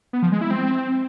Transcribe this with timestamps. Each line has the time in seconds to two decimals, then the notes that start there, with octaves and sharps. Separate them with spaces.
0.13 B3
0.23 F3
0.32 G#3
0.41 E4
0.51 C4